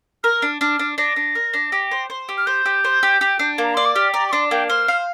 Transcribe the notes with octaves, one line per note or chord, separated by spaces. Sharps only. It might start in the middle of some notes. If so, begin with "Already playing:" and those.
A#4 F6
D4
D4 F6
D4
D4 A#6
D4
A#4
D4
G4
C5
C5
G4
F6
C5 G6
G4
C5
G4
G4
D4
A#3 A#5
D5 C6
D6
G4 F6
D5 A#5
D6
D4 C6
A#3 G5
C5 F6
F5